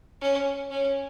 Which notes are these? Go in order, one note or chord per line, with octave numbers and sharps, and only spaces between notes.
C#4
C#4